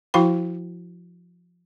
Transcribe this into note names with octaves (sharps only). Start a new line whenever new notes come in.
F3 E4 F#4 F5 G5 B5